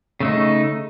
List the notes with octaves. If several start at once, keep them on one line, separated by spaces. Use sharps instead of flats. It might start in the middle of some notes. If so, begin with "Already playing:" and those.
C#3 A3 D#4